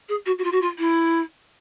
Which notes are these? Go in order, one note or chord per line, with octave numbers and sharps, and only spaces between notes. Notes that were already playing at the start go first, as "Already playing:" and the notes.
G#4
F#4
F#4
F4
F#4
F4
E4